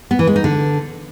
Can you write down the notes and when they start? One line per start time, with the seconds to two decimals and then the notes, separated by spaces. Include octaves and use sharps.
0.11 B3
0.19 E3
0.27 G#3
0.36 D#4
0.44 D3